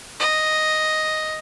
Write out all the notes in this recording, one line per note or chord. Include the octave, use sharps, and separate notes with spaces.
D#5